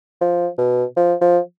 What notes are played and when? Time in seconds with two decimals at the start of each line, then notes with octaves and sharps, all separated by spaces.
0.21 F3
0.58 B2
0.96 F3
1.21 F3